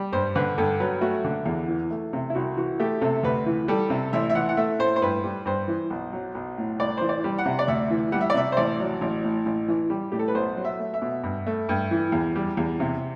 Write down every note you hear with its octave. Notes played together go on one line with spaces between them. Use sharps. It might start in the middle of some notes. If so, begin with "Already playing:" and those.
Already playing: G3
G2 C5
D3 B4
G2 A4
F#3 B4
A3 F#4
D3
E2
E3
A3
C3
E4
C2 F#4
E3 F#4
A3 G4
C3 A4
D2 B4
E3
G3 A4
C3
A1 E5
E5
E3 F#5
F#5
A3 E5
A2 C5
C5
G2 B4
G3
G2 C5
E3
B1
F#3
B1
A2
C2 D5
E3 C5
D5
G3
F#5
C3
D5
D2 E5
E3
G3 F#5
E5
D5
C3 E5
C5
A1 D5
F#3
A1
A2
A1
E3
G3
A2 G4
A4
B4
B1 C5
F#3
E5
A3
E5
B2
G2
A3
G2
E3
E2
G3
E2
C3